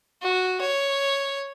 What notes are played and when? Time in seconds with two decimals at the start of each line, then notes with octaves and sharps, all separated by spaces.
0.22 F#4
0.61 C#5